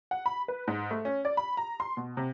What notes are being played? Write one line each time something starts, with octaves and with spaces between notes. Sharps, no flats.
F#5
B5
B4
G#2
A3
C#4
D5
B5
A#5
C6
B2
C3